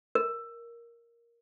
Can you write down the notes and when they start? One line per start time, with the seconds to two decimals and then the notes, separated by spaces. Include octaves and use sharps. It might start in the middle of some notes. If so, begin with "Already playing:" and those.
0.15 A#4